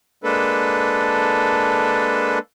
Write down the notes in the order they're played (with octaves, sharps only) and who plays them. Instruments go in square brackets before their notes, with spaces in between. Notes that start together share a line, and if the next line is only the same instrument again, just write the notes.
[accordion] G#3 A#3 D4 A4 B4